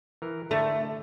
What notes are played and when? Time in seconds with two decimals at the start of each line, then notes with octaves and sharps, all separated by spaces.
0.22 E3 A#4
0.51 D3 A3 E5